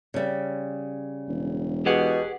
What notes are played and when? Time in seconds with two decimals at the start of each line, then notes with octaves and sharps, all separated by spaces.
0.14 C#3 G3
1.28 E1
1.86 B2 G4 G#4 F#5